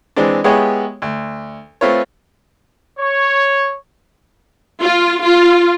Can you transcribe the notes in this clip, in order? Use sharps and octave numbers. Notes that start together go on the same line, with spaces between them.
E3 G#3 C4 D4
G#3 B3 E4 G4 G#4 C#5
D2
A3 C4 F4 B4 C#5
C#5
F4
F4